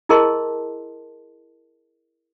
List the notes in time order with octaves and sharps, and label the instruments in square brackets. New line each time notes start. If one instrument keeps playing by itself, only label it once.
[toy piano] E4 G#4 A#4 D#5 A5 C6